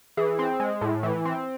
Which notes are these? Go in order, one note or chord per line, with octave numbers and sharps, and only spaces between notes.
E3 G#4
C4
G#3
A2
E3
C4